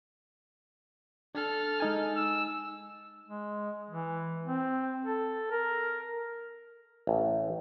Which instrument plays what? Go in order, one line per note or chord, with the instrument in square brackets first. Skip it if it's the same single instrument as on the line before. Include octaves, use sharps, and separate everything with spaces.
[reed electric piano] D4 [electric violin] A4 F6
[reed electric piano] G#3 D#4 G#5
[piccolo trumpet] E6
[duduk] G#3
E3
C4
A4
A#4
[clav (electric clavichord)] A1